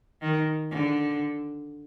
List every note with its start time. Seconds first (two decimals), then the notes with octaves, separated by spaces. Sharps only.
0.22 D#3
0.71 D3